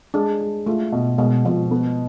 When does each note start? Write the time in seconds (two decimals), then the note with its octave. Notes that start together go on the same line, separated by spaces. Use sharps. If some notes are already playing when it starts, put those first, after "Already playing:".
0.14 G#3 D4
0.41 G#3
0.66 A3 F4
0.92 B2
1.18 B2 G#3
1.45 B2 F3
1.71 B3